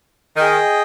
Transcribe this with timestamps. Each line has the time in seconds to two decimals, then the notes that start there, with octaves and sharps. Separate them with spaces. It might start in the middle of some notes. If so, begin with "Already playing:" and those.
0.36 D#3 G#4 D#5 G5